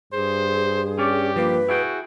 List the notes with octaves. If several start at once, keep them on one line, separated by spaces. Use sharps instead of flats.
G2 G#4 C5
C#4 G4 D5
F3 A#3 B4
E4 F#4 G#4 G5